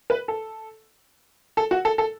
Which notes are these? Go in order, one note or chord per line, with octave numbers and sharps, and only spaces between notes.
B4
A4
A4
F#4
A4
A4